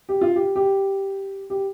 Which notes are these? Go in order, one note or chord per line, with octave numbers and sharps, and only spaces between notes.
G4
F4
G4
G4
G4